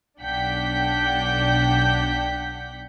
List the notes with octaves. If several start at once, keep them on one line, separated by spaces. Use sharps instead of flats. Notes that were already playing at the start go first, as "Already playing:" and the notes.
B1 D4 F#5 G5 G6 B6